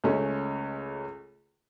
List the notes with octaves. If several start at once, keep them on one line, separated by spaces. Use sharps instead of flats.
C#2 A3 C#4